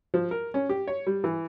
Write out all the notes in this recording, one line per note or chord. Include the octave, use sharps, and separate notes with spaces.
F3
A#4
C#4
G4
C#5
G3
E3